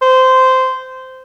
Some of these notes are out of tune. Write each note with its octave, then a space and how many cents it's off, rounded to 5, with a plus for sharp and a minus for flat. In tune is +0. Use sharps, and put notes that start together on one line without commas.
C5 -15